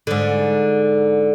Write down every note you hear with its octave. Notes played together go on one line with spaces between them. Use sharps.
G#2 D3